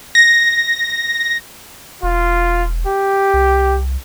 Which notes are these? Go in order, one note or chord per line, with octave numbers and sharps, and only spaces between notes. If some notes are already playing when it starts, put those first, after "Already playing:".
A#6
E1 F4
G4
C2